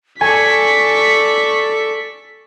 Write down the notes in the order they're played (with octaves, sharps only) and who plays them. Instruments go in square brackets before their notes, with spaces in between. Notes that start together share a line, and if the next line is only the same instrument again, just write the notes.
[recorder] A4 [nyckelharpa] D5 C#6 [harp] G#5 [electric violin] B6